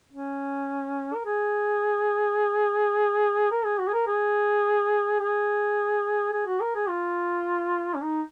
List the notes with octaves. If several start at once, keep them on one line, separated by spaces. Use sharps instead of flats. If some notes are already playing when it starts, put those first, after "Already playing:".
C#4
A#4
G#4
A#4
G#4
F#4
G#4
A#4
G#4
G#4
G#4
F#4
A#4
G#4
F4
C#4
D#4